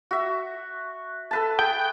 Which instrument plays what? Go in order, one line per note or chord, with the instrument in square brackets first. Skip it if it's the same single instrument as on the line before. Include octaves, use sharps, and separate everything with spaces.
[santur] F#4 E5
A4 B4 A5
[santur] G#4 [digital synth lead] G5